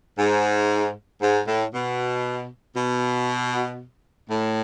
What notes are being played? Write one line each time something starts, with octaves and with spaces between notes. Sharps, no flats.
G#2
G#2
A2
B2
B2
A2